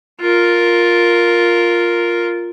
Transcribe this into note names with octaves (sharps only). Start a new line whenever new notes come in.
F4 A#4